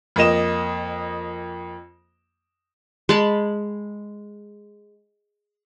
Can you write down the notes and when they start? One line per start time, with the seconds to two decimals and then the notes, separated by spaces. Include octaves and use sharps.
0.16 F2 A#3 D#5 E7
3.09 G#3 A5 B5